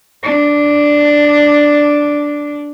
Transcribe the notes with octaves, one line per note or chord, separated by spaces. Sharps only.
D4